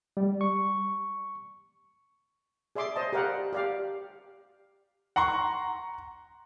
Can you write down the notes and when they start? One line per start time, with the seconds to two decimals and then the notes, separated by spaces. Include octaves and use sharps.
0.17 G3
0.41 C#6
2.76 G#4 D5 E5 C6 D6
2.96 C5 D#5 A5
3.13 G4 A#4 D5 F5 F#5
3.53 G4 D5 F5
5.16 F#5 A#5 C6 C#6